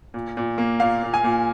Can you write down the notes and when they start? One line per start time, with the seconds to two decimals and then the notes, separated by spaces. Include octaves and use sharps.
0.14 A#2
0.37 A#2
0.58 A#3
0.80 A#2 F5
1.03 A#2
1.14 G#5
1.24 A#2